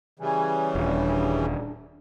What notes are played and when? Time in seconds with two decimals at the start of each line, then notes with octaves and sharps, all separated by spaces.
0.19 C#3 E3 G3 G#5
0.75 D#1 D4